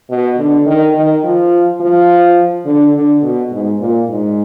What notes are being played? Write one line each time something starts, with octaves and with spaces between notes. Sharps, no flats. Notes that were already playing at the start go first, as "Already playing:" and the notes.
B2
D3
D#3
D#3
F3
F3
D3
D3
B2
G#2
A#2
G#2